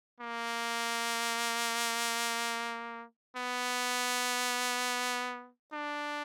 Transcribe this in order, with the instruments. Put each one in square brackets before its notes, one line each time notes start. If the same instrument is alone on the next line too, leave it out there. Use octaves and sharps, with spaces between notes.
[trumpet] A#3
B3
D4